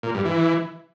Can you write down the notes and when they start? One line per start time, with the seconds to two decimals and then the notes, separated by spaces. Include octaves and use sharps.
0.03 A#2
0.14 G2
0.25 E3